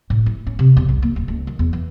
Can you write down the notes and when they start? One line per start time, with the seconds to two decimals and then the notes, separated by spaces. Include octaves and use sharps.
0.10 A2
0.26 E4
0.47 C#4
0.59 C3
0.77 E2
0.89 C2
1.02 A#3
1.16 D1
1.28 C#2
1.47 D#3
1.59 E2
1.73 E3